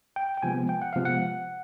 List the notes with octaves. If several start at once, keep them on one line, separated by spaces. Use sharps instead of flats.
G5
G5
C3 F3 G#3 B3 G#5
G5
F#5
C3 F3 G#3 B3 F5
F#5